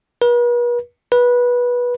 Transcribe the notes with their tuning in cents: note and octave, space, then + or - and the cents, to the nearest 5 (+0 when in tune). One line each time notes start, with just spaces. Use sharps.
B4 -45
B4 -20